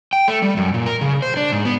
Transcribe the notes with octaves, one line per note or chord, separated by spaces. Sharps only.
G5
A3
G3
F#2
A#2
A#4
C#3
C5
D4
G#2
B3